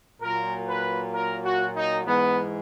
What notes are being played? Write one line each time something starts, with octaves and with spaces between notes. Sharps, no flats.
A#2 F#3 A#4
B4
A#4
F#4
D#4
G#2 E3 G#3 B3